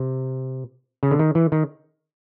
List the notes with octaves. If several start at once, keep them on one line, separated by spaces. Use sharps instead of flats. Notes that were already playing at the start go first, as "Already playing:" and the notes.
Already playing: C3
C#3
D3
D#3
E3
D#3